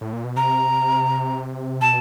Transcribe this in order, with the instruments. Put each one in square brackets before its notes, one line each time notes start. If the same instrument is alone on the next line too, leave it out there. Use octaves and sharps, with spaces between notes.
[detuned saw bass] A2
A#2
B2
[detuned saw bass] C3 [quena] A#5
[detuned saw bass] B2 [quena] A5